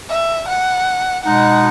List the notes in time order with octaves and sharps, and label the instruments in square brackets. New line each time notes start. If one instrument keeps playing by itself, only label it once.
[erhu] E5
F#5
[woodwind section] B2 G#3 D#4 [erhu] F#5